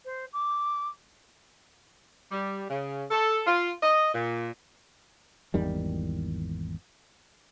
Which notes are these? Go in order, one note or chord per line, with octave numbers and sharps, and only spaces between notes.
C5
D6
G3
C#3
A4
F4
D#5
A#2
G#1 E2 D#3 G3